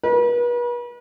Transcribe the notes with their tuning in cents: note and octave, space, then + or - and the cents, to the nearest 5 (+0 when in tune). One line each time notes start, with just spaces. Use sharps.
B4 -40